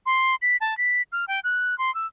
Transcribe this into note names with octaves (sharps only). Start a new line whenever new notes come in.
C6
B6
A5
B6
F6
G5
F#6
C6
E6